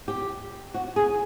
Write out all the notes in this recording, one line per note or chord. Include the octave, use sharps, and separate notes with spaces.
G4
F#4
G#4